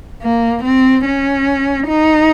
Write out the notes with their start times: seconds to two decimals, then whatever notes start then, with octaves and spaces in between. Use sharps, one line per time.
0.23 A#3
0.64 C4
1.05 C#4
1.88 D#4